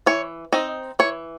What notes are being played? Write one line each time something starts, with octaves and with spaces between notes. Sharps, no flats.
E3 C#5
C4 D#4 D#5
E3 C#5